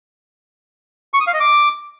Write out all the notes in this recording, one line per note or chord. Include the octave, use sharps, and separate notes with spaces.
C#6
D#6
F5
D#5
D6